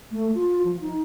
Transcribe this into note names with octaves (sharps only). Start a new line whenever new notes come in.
A3
F4
F3
D#4